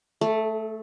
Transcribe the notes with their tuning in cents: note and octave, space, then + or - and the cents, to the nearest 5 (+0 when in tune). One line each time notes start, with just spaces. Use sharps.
A3 +0 A4 -45